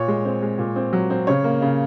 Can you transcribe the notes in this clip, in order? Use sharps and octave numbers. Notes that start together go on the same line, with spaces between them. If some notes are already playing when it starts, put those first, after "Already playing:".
Already playing: A#2 C#5
G#3
C4
G#3
A#2
C4
F#3
C4
C#3 C#5
A#3
C#3